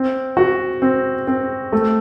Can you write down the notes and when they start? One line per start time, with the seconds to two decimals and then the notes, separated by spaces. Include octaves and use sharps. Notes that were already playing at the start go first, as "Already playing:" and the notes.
Already playing: C4
0.37 F#4
0.82 C4
1.27 C4
1.73 A3